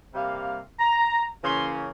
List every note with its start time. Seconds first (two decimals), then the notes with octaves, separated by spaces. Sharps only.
0.14 C3 G3 A#3 F5
0.80 A#5
1.44 C#3 E3 A#3 C#4 C6